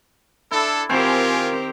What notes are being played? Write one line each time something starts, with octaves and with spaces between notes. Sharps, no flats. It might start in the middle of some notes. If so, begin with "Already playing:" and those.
D4 E4 A4
D#3 C4 F4 G4 A#4 C5 G#5